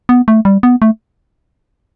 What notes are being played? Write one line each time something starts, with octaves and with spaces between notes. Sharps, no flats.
B3
A3
G3
B3
A3